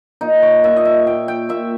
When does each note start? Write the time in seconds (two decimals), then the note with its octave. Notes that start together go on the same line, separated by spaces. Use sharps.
0.21 A#2 D#4
0.42 C#5
0.64 A#2 E5
0.76 D#5
0.85 E5
1.07 A#2 G5
1.28 G5
1.49 A#2 E5